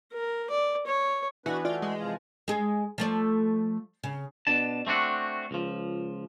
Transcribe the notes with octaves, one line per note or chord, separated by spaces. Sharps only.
A#4
D5
C#5
E3 B3 D4 F#4 B4
A3 F4 F#4 D5
G#3
C3 F3 F4
G#3 G#4
F3 A3 D5
C#3
B2 D4 A5
A3 C4 D4 F#4
C#2 F3